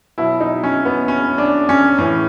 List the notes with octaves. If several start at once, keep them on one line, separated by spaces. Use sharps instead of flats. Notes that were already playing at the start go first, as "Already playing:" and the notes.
B2 F#3 E4
D#4
C#4
B3
C#4
D4
C#4
A2 E3 C#4